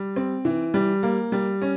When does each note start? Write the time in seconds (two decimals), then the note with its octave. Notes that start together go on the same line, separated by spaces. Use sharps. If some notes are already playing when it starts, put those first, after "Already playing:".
Already playing: G3
0.16 C4
0.45 E3
0.74 G3
1.03 A#3
1.32 G3
1.62 C#4